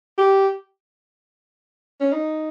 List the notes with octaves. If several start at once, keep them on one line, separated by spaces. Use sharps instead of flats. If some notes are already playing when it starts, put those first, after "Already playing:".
G4
C#4
D#4